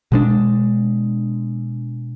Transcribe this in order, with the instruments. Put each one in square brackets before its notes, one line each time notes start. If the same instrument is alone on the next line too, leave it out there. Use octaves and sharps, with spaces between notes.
[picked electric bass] B2 G#3 D4